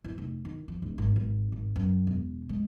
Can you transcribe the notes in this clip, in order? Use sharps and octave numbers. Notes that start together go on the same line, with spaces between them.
E3
F1
D#3
F3
D1
G#1
G#1
G#1
F#2
E1
G#3